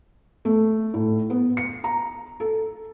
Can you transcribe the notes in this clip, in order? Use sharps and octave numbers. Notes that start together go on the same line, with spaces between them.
A3
A2
B3
C#7
A#5
A4